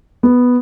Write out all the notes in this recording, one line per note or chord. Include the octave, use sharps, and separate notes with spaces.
B3